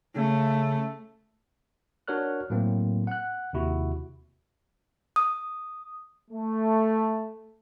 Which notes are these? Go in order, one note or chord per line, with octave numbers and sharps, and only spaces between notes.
C#3 A3
D4 F#4 A#4 C#5 F6 F#6
A2 F#3 A#3 C4
F#5 F#6
D#2 C3 E4 F#4
D#6
A3